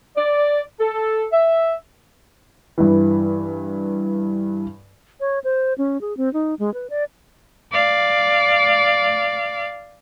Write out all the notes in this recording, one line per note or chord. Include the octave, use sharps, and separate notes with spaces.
D5
A4
E5
G2 E3
C#5
C5
C#4
G#4
C4
D#4
G#3
B4
D5
D5 F5